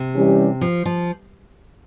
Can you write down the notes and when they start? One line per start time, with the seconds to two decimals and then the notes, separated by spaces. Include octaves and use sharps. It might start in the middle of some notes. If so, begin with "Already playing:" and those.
Already playing: C3
0.14 E3 G3 C#4 G4
0.61 F3
0.85 F3